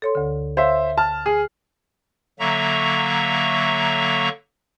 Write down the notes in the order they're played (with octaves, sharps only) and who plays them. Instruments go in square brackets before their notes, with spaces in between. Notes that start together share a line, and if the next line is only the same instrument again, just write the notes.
[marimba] A4 C#5 C6
D2 D3
[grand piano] C5 E5 [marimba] C#5 F5
[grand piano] A5 F6
G#4
[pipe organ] D3 F#3 A#3 E5 A#5 C#6